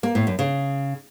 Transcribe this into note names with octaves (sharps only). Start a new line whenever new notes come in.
A#3
A2
F#2
C#3